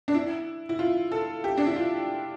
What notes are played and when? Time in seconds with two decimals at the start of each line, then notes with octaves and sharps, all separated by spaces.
0.08 D4
0.14 E4
0.69 E4
0.79 F4
1.12 A4
1.44 G4
1.58 D4
1.67 E4
1.76 F4